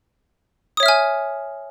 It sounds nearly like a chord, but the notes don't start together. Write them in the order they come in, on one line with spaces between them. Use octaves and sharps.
D#6 C#5 E5 F6 G#5